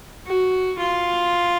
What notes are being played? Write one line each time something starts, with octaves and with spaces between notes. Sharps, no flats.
F#4
F4